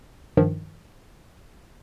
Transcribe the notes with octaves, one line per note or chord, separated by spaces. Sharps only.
G2 D#3 F3